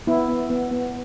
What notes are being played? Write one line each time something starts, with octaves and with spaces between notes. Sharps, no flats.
B3 E4
B3
B3
B3